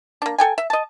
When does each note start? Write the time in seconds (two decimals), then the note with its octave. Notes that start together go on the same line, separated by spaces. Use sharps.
0.22 A#3 D4
0.38 A4 G5 G#5
0.58 E5
0.70 D#5 A5